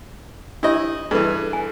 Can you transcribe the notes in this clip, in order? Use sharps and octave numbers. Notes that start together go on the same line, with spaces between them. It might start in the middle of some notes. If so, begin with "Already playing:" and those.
D4 E4 G4 C#5 D#5
G2 E3 G#4 A4 B4
G#5